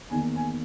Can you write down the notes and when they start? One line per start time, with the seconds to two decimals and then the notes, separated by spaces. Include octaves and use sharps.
0.10 E2 D#3 A#3 G#5
0.35 G#5